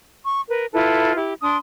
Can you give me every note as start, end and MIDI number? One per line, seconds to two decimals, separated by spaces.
0.25 0.41 85
0.49 0.66 70
0.49 0.66 71
0.73 1.15 64
0.73 1.15 65
0.73 1.15 69
0.73 1.15 71
1.15 1.33 64
1.15 1.33 67
1.41 1.57 62
1.41 1.57 84
1.41 1.57 87